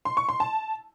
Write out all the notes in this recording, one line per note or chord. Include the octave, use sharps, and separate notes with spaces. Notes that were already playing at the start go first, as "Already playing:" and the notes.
C6
C#6
C6
A5